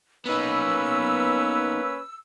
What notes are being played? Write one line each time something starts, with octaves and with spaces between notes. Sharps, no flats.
A#3 B3 C#4 D#4 B4 E6